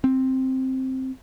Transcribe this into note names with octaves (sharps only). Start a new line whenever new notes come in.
C4